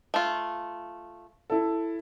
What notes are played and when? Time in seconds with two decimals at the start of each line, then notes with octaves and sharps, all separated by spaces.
0.14 A3 F4
1.50 E4 A4